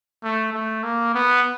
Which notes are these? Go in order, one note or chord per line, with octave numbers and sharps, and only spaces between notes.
A3
A3
A#3
B3